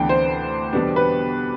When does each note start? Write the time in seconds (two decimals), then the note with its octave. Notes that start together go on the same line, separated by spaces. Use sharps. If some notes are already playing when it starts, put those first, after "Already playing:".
Already playing: D2 C3 E3 B3 D4 G5
0.09 C5
0.73 E2 B2 G3 B3 D4
0.96 B4